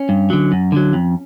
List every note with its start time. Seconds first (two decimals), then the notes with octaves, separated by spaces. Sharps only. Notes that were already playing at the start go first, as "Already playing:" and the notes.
Already playing: C#4
0.09 G2
0.30 D3 F#3
0.52 F#2
0.72 D3 F#3
0.93 F2